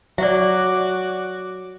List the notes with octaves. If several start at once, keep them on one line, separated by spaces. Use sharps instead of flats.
F#3 F#4 D5 E5 D6